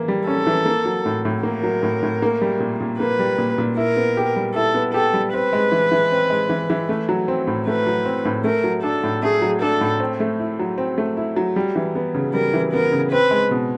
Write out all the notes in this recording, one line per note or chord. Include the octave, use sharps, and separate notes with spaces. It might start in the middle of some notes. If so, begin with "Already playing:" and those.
Already playing: E3 A#3
G3
C#4 A4
E3
A#3
F#3
A2
A2
A#3 A#4
F#3
A2
A2
A#3
G3
A#2
A#2
A#3 B4
G3
A#2
A#2
E4 A#4
B3
G4
G3
E4 A4
B3
G4 A4
G3
C4 B4
G#3
E3
E3
C4
G#3
E3
E3
A3
F#3
C4
A2
A3 B4
F#3
C4
A2
A3 A#4
F#3
D4 A4
A2
A3 G#4
F#3
D4 A4
A2
C4
A3
E4
F#3
C4
A3
E4
F#3
G3
E3
B3
C#3
G3 A#4
E3
B3 A#4
C#3
C4 B4
G#3
B2